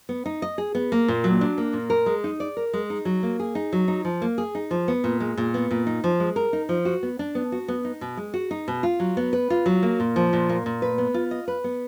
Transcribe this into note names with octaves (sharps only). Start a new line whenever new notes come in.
B3
D#4
D#5
G#4
B3
A#3
A#2
F#3
D4
A#3
A#2
A#4
G#3
D#4
D5
A#4
G#3
D#4
F#3
A#3
G#4
D#4
F#3
D#4
F3
A#3
G#4
D#4
F3
B3
A#2
G#3
A#2
B3
A#2
D#4
F3
G#3
A#4
D#4
F3
F#4
B3
D4
B3
F#4
B3
D#4
B2
G#3
F#4
D#4
B2
F4
F#3
B3
B4
F4
F#3
A#3
A#2
F3
A#2
A#3
A#2
B4
B3
F4
D#5
B4
B3